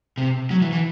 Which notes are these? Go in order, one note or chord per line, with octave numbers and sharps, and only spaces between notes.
C3
F#3
E3
E3